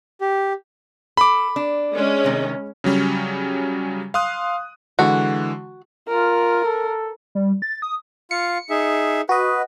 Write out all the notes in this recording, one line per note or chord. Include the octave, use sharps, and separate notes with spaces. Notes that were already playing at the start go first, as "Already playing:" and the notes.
G4
A4 B5 D6
D4
G#3 C#4
C3 D#3
C#3 F#3 G3 C#4
F5 C6 D#6 F#6
D3 E3 G#3 F#4
F4 A#4
A4
G3
A6
D#6
F4 F5 C#7
D#4 G#4 E5
F#4 B4 D#5